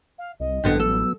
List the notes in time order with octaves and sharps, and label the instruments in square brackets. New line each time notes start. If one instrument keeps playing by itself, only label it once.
[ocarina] F5
[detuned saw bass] C2 [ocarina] D#5
[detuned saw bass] A1 [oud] G2 D3 B3 [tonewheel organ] G5
[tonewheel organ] F#3 B3 [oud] A4 [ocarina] E6